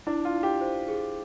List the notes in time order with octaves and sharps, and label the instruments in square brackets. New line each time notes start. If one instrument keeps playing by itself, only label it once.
[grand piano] D4 [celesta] E4
[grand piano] F4
[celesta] E4
[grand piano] G4
[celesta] C5
G#4